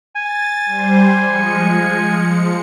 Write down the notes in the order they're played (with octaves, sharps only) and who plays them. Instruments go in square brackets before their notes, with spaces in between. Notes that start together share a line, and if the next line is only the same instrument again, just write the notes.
[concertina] G#5 [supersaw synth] A6
[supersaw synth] G3 C5
F3 G#3 C#7